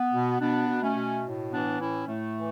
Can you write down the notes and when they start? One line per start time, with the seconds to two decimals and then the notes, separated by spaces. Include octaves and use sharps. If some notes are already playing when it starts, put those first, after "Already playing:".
Already playing: B3
0.13 B2
0.40 B2 B3 D4
0.69 B2
0.82 A3 C#4
0.96 B2
1.25 A2
1.52 E3 B3 D4
1.80 A2 C#4 E4
2.07 A2 A3
2.36 E3